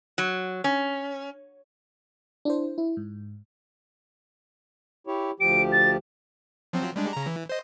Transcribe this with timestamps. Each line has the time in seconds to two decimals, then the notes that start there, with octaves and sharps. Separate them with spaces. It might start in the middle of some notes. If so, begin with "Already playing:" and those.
0.18 F#3
0.64 C#4
2.45 D4 E4 C5
2.78 E4
2.97 G#2
5.07 E4 G4 C#5
5.40 D2 F3 G4 D7
5.72 A6
6.73 F3 F#3 C4
6.96 G3 G#3 D4
7.13 C#3 A#5
7.26 E3
7.49 C5 D#5